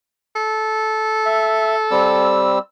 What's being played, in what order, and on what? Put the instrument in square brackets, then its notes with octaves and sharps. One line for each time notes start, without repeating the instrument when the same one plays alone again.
[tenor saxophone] A4
[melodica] E5
G3 C4 E6